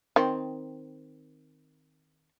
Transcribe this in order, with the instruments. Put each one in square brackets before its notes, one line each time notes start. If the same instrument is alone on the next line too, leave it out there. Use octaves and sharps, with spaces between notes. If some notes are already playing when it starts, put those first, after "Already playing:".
[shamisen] D#3 C4